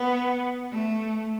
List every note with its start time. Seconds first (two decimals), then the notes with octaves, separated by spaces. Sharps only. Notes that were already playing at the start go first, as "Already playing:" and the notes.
Already playing: B3
0.72 A3